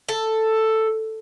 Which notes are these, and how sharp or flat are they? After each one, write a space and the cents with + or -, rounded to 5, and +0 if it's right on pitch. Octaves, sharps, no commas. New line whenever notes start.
A4 +5